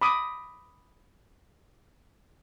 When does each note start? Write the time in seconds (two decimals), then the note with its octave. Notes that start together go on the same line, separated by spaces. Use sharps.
0.01 B5 D6 D#6